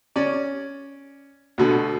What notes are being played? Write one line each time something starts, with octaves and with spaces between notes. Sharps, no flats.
C#4 D5
D2 B2 D3